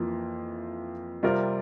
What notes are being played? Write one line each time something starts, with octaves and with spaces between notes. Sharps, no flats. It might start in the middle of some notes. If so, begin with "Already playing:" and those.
Already playing: F2 E3 A#3 F4
C3 G3 C4 F4 A#4